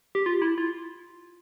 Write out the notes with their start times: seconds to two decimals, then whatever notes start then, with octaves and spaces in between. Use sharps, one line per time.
0.15 G4
0.26 F4
0.42 E4
0.58 F4